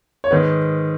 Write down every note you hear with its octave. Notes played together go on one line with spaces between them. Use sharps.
C#5
G#2 D#3 B4